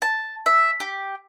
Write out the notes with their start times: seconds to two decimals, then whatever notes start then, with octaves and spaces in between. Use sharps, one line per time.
0.02 A5
0.46 E5
0.80 G4